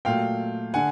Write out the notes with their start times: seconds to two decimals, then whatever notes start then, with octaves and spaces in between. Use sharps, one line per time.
0.05 A#2 F#3 A3 F5 G5
0.74 D3 F#5 G#5